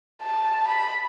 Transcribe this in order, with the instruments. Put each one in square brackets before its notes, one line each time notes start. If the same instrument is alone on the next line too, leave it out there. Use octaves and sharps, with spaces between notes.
[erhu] A5
B5